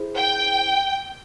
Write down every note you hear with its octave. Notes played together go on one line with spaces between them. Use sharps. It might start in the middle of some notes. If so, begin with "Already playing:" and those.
Already playing: E4 G#4 C5
G5